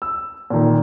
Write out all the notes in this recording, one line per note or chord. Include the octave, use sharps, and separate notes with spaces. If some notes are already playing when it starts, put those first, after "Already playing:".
E6
A#2 D#3